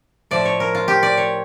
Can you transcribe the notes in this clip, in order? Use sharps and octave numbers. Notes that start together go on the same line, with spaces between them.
A2 F3 A3 D5
C#5
A#4
F4
G4
D5
C#5